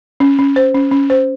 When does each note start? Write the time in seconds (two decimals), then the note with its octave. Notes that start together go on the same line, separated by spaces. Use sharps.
0.20 C#4
0.39 C#4
0.56 C5
0.75 C#4
0.91 C#4
1.10 C5